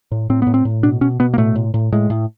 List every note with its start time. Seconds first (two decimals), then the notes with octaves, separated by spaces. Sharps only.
0.12 A2
0.30 A2 C4
0.42 A2 B3
0.54 C4
0.65 A2
0.83 B2 D4
1.01 B2 C#4
1.20 B2 B3
1.34 A#3
1.38 A2 A3
1.55 A2
1.74 A2
1.92 A2 G#3
2.10 A2